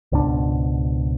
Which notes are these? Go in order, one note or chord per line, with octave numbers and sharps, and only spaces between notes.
C#2 G#2 B2 D4